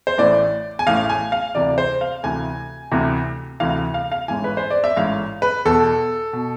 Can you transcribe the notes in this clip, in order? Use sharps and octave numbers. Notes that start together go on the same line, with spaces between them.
C5
A1 A2 E3 D5
G#5
A1 A2 E3 F5
G#5
F5
D2 C3 E3 D5
C5
F5
D2 C3 E3 G#5
D2 C3 E3
D2 C3 E3 F5
F5
F5
A1 G#2 E3 G#5
B4
C5
D5
E5
A1 G#2 E3 F5
B4
E2 B2 A4
B2